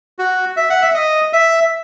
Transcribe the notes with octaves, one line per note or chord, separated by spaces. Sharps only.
F#4
E5
F#5
E5
D#5
E5